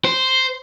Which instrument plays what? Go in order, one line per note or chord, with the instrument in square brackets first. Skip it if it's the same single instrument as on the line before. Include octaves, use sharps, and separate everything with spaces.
[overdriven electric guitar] C5